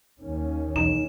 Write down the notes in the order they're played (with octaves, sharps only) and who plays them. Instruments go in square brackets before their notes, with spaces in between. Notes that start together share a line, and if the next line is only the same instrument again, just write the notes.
[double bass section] D#2 D#3 C#4
[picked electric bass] B1 E2 [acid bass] D#4 [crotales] E7